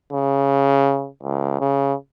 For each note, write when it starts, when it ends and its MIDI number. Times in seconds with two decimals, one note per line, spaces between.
0.13 1.08 49
1.23 1.60 37
1.60 1.94 49